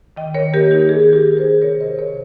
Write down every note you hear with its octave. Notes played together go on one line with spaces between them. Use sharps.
D#3 D#5 G5
D#3 A#4 C#5
A#3 G4 A#4
D#4 G4
D#3 G#4
D#3
G4 A#4
D#3
G#4 C5
D#4
C3 A#4 C#5
C3 C5 D#5
C3 A#4 C#5